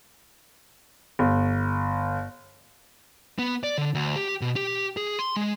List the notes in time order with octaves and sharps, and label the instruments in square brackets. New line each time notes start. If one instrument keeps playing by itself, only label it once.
[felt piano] G1
[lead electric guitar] B3
D5
D3
D2
G4
B2
G4
G#4
C6
G#3